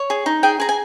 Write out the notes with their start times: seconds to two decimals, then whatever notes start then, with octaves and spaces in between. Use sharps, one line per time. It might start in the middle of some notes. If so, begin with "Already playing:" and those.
Already playing: C#5
0.10 G#4
0.26 D#4
0.43 G#4 G5
0.60 G#4 A#5
0.69 G#5